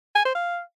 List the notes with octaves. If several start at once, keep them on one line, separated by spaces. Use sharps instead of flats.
G#5
C5
F5